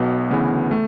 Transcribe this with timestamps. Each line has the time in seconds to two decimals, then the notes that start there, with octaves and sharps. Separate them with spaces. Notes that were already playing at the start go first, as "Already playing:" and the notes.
Already playing: B1 B2 B3
0.30 D2 C#3 E3 B3
0.71 A3